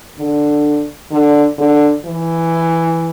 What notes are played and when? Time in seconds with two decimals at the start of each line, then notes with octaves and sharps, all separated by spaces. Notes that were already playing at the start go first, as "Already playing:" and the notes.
0.18 D3
1.11 D3
1.58 D3
2.05 E3